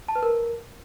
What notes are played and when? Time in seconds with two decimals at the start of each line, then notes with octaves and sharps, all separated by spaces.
0.08 A5
0.16 B4
0.23 A#4